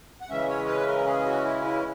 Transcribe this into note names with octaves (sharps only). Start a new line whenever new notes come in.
F#5
C#3 E3 G#3 C#4 E5
C#5
B4
A#4
G#4
F#4
E4
E4